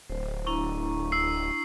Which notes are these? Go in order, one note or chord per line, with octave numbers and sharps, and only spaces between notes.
D1 C5
D4 E4 A#5 C#6
E6 C7